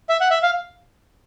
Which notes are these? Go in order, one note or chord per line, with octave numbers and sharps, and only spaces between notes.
E5
F#5
E5
F5